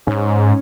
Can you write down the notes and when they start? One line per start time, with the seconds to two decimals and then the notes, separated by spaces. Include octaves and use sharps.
0.07 G#2 C#4